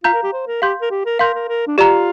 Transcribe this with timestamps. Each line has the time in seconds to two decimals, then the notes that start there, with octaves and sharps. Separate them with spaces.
0.04 F4 F5 A#5 G6
0.14 A#4
0.23 G4
0.33 C5
0.47 A#4
0.62 G4 F5 C6 G6
0.81 A#4
0.90 G4
1.05 A#4
1.19 A#4 F5 C6 G6
1.34 A#4
1.48 A#4
1.67 D4
1.78 F4 G4 D5 A#5